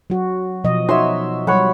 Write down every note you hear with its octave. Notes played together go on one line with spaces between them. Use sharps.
F#3 F#4
B2 F3 D#5
D#4 F#4 C#5 E5 C6
F#3 G3 C#5 F#5 B5